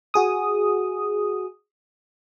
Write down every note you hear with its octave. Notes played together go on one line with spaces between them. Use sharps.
F#4 G#4 D#6